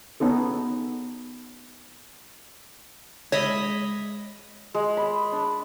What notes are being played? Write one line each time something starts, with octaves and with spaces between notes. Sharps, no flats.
B3 C#4 D#4 A4
G#3 C#5 D#5 E5 B5
G#3
B5
D4